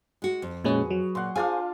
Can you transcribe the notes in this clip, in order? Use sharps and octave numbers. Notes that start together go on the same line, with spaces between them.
G#3 F#4
F2
A#2 G#3 C#4 F#4 G#4 B4
F#3
A#2 F#5 C6
D4 F4 G#4 C5 F5 G#5